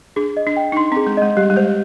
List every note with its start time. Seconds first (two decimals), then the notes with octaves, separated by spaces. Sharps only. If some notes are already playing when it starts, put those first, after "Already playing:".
0.16 D4 G#4
0.37 D#5
0.47 D4
0.57 G5
0.72 D#4
0.77 D4 C6
0.92 C4 G#4
1.07 G#3
1.17 G#3 D#5
1.37 G3 G4
1.50 G3
1.57 G#3 C5